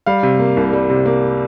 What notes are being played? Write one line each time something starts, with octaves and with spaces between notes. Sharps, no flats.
G3 F5
C3
A#3
C2
G3
C3
A#3